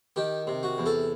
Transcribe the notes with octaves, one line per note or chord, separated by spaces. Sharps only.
D#3 G4
C3
F#4
E2
A4